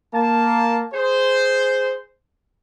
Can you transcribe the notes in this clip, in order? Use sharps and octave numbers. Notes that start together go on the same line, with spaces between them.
A#3 A5
G#4 C5